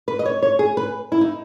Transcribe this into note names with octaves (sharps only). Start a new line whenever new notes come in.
B4
D#5
C#5
C#5
G#4
B4
E4
D#4